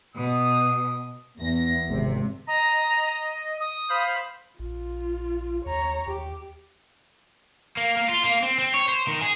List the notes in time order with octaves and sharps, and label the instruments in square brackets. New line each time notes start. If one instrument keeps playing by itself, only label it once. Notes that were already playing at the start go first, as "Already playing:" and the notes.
[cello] B2 [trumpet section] D#6
[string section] E2 A#6
G#1 C3
[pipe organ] D#5 [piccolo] A#5
[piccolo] D#6
[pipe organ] C5 F5 B5
[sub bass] A#1 [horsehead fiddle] F4
[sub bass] D#2 [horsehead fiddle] C#5 A#5
[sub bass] D#2 [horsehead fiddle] G4
[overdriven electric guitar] A#3
A#3
F4
A#3
C4
C4
C#5
C5
D#3
G#4